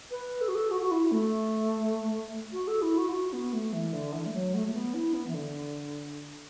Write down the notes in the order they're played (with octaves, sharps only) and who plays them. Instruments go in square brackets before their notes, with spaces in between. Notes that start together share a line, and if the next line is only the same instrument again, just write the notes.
[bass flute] B4
A4
F#4
A4
F#4
F#4
E4
A3
F#4
A4
E4
F#4
E4
F#4
B3
A3
E3
D3
E3
A3
F#3
A3
A3
B3
E4
B3
E3
D3